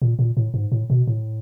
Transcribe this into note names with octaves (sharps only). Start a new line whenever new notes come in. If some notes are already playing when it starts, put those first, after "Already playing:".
A#2
A#2
A2
G#2
A2
B2
A2